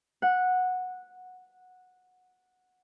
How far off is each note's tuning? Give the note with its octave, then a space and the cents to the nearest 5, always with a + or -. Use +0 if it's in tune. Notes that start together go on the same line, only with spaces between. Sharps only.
F#5 -10